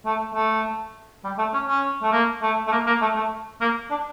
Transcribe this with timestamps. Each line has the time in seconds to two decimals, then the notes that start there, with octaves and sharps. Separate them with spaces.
0.05 A3
0.34 A3
1.24 G3
1.38 A3
1.54 C#4
1.68 C#4
2.02 A3
2.13 A#3
2.42 A3
2.67 A3
2.72 A#3
2.87 A#3
3.02 A3
3.16 A3
3.61 A#3
3.90 D4